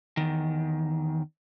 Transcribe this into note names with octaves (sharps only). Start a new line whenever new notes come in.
E2 D#3